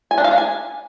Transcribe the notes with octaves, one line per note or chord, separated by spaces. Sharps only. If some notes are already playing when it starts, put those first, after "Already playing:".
G#5
D4
F5
D4
G#5